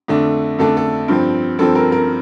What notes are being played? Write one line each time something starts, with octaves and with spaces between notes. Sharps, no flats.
F2 D3 A3 D4
F2 D3 A3 D4 A4
A4
G2 F3 C4
G2 F3 C4 A4
A#4
A#4